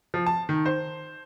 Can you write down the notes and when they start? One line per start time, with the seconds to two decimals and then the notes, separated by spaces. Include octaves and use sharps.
0.14 F3
0.26 A5
0.49 D#3
0.66 C5